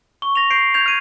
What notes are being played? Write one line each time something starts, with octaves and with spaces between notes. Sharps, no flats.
C#6 G7
A#6 F7
G6 C7 D7
G6 G#6 F7
F6 G#6 D#7